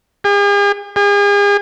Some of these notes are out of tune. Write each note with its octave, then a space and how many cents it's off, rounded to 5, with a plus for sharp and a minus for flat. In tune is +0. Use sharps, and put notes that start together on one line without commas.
G#4 -45
G#4 -40